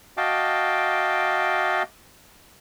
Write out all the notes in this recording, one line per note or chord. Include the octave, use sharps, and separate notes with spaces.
F#4 D#5 F5 G5 A5 D6